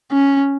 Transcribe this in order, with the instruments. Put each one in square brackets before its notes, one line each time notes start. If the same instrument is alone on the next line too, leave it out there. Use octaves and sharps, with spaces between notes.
[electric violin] C#4